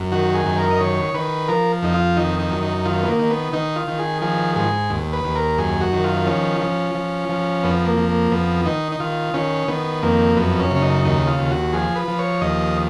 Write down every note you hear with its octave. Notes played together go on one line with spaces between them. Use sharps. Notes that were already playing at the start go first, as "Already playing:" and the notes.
Already playing: F#2
D#3 F#4
G#4
F#2
A#4
D#5
D#3 C#5
D#3 B4
F3 A#4
F2 D#4
F4
D#3 D#4
D#4
F#2
D#4
D#3 F4
B3
A#3
D#3
B3
D#3 D#4
F4
D#3
G#4
F3 G#4
G#2 G#4
D#2
B4
D#2
A#4
F#2 G#4
F#4
D#3
F4
F3 C#4
F3
F3
F3
F2 B3
A#3
F3
A#3
F2 B3
D#3 D#4
D#4
D#3 F4
D#3 C#4
D#3 B3
F2 A#3
F#2 B3
C#4
C#3
C#4
D#4
D#2 D#4
F4
D#2
F#4
F3 G#4
B4
F3
C#5
D#2 D#5